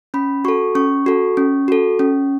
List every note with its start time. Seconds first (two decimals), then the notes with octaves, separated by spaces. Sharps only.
0.14 C#4 B5
0.45 F#4 A4 C#6
0.75 C#4 C#6
1.06 F#4 A4
1.37 C#4
1.68 F#4 A4
1.99 C#4